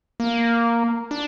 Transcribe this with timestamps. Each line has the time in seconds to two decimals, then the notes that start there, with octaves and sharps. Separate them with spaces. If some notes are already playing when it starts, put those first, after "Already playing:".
0.20 A#3
1.11 D4